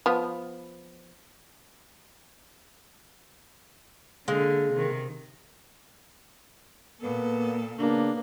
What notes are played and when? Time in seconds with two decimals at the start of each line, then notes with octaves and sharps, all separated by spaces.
0.06 F3 B3
4.28 D3 G#3 A#3
4.73 C3 D#3
7.01 A#2 A#3 B3 A4
7.78 C#3 A#3 B3 D4